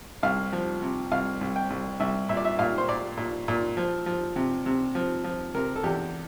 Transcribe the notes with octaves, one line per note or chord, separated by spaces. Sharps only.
C2 F5
F3
C3
C2 F5
C2
G5
C2
C2 E5
A#2 E5
D5
E5
A#2 F5
C5
A#2 D5
A#2
A#2
F3
F3
C3
C3
F3
F3
C3 A#4
A4
E2 G4